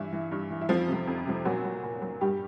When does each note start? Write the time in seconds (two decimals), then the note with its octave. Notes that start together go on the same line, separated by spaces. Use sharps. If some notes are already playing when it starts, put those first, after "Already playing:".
Already playing: G2 E3 E4
0.13 E3
0.31 G2
0.51 E3
0.61 E4
0.69 F2 F3 F4
0.88 C3 F3
1.07 F2
1.26 C3 F3
1.45 A#2 F#3 F#4
1.64 F#3
1.83 A#2
2.02 F#3
2.21 G2 G3 G4